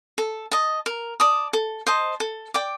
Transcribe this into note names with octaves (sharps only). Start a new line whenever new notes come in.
A4
D#5 A5
A#4
D5 A5 D#6
A4
C5 D#5 A5
A4
D5 G5 D6